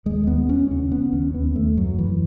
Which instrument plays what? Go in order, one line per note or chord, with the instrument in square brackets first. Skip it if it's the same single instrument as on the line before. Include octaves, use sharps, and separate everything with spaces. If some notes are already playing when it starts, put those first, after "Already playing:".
[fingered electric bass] D#2 G#3
D#2 B3
D#2 C#4
C#3 C#4
C#3 B3
D#2 C#4
D#2 B3
D#2 A3
F#2 F#3
F#2 E3